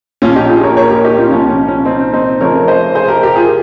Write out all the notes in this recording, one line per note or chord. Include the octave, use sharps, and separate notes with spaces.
A#1 A#2 F3 C#4 F4
D#4 G4
F4 G#4
A#4 C#5
A#4 C#5
G4 A#4
D#4 G4
C#4 F4
C2 A#2 F3 C#4
C#4
C#4
C4 D#4
C4 D#4
F1 F2 C#3 F3 A#4 C#5
C5 D#5
G#4 C5
G4 A#4
G4 A#4
F4 G#4